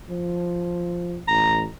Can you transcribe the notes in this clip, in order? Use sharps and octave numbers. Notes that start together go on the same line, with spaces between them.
F3
A1 A#5